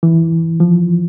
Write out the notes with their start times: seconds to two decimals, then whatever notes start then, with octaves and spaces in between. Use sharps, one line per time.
0.03 E3
0.60 F3